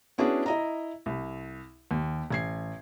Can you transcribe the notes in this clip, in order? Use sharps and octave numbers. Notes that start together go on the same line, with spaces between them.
B3 C#4 D4 E4 F#4 G#4
E4 D#5 A#5
C2
D#2
A1 G#6 C7